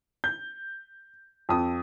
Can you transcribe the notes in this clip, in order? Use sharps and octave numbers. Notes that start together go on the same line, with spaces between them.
G6
F2 D#6